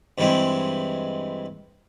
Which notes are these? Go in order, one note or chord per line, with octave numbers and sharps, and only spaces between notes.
G2 E3 G#3 C4